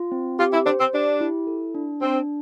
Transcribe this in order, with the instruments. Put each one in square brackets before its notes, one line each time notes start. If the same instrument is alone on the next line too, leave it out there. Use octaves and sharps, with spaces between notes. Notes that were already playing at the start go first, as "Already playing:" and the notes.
Already playing: [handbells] F4
C4
[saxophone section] F4 [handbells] G4
[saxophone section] E4
[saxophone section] D4 [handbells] C5
[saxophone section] C4
[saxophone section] D4 [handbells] G4
[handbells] E4
A4
D4
[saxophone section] C4 [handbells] D4